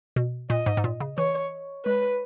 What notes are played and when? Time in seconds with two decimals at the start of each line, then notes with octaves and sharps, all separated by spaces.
0.16 B2
0.50 A#2 D#5
0.66 G#2
0.77 G#2
0.84 A#2
1.00 C#3
1.18 E3 C#5
1.85 G#3 B4